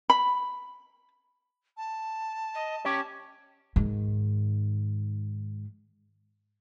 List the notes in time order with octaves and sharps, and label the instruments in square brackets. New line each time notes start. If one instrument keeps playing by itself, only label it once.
[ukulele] B5
[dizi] A5
[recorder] D#5
[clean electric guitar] C#4 G4 C#5 [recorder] D6
[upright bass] G#2 D#3